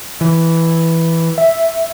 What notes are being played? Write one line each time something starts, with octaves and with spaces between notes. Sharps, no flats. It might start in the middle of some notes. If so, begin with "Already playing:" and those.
E3
E5